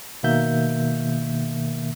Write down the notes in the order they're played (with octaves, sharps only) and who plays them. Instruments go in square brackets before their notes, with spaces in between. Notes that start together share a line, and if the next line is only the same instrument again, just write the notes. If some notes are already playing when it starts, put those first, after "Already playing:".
[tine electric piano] B2 D#3 A#3 E5 G6